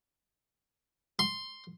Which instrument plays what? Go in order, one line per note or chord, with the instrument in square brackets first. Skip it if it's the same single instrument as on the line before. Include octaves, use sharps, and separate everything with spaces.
[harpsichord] C6